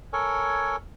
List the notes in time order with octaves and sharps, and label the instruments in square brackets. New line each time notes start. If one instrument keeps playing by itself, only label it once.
[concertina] A4 A#4 C#5 G#5